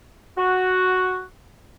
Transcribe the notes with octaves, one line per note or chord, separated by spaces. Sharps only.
F#4